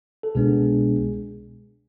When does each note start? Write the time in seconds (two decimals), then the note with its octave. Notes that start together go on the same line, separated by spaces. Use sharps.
0.23 A4
0.35 C2 B2 G#3 B3 D4 G#4